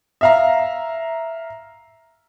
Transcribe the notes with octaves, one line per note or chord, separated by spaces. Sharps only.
E5 F5 A#5